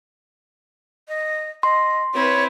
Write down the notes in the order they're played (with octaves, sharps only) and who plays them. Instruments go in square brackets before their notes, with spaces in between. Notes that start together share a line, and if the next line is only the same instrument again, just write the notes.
[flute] D#5
[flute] D#5 [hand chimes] C6
[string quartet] C4 E4 B4 [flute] C#5